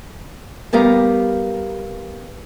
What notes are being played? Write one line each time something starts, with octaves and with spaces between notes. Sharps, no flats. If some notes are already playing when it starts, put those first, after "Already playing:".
G3 B3 G4 A#4 F5 A#5